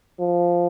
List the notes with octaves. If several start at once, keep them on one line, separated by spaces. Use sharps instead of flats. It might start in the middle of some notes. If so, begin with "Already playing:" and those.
F3